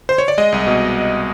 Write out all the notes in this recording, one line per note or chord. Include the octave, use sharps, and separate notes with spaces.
C5
C#5
D5
G#3 D#5
C2
B2